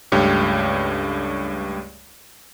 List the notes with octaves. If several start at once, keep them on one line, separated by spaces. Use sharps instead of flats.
C#2 G2 A3 G4 C#5